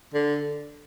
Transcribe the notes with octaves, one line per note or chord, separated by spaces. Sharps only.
D3